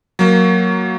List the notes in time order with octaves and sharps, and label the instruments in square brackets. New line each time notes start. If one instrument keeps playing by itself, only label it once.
[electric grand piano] F#3 A#3